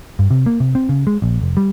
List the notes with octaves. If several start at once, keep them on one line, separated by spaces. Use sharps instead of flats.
G2
C3
A#3
C3
C4
C#3
G#3
A#1
F1
G3